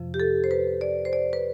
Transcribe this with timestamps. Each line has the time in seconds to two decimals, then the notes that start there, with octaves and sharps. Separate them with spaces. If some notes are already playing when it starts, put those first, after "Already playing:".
Already playing: F2 C3 F3
0.14 G4
0.20 A4
0.44 C5
0.51 B4
0.81 D5
1.05 C5
1.13 D5
1.33 B4